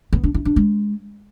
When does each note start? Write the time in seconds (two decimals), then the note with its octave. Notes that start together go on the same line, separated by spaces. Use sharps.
0.13 B3
0.24 D4
0.34 E4
0.45 D4
0.56 G#3